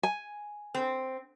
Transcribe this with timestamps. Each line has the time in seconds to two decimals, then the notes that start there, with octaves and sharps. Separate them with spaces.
0.03 G#5
0.75 C4